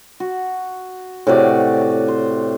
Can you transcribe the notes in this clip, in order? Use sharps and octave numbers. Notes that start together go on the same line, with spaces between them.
F#4
A2 C3 F#4 D5
C5